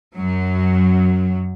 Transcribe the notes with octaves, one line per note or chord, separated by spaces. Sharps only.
F#2 F#3